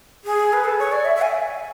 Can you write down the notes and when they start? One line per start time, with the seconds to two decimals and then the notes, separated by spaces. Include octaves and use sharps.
0.24 G#4
0.53 B4
0.64 A4
0.79 C#5
0.92 D5
1.05 E5
1.16 E5
1.22 G#5